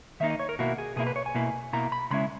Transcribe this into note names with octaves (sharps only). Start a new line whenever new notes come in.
D#3 A#3 D#4 E5
D#5
C#5
A#4
B2 A#3 E4 F#4
G#4
B2 A#3 E4 G#4
B4
C#5
G#5
B2 A#3 E4
B2 A#3 E4 A#5
B5
C#3 G#3 C#4 E4 B5